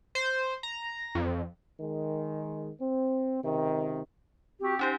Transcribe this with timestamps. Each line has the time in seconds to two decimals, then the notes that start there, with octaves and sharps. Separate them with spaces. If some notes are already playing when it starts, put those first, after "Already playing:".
0.15 C5
0.63 A#5
1.15 F2
1.81 D#3 G#3
2.81 C4
3.43 C#2 C3 D#3
4.61 C4 F#4 G4
4.79 C#4 D#4 G4 C5 G5